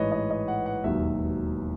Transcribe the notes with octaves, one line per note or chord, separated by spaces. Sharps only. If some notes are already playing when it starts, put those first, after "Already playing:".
Already playing: A1 G#2 E3 B4 C#5 D#5
D#5
D#5
F#5
F#5
E1 D#2 D#3 F#3 E5